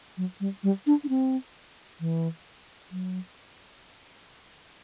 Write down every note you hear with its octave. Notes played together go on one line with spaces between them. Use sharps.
F#3
G3
G3
D4
D4
C4
E3
F#3